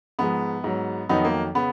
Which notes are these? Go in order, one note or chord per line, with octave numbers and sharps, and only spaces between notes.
G#2 F3 G#3 B3
G#2 F#3
F2 D#3 F#3 B3 D#4
A#3
C#3 B3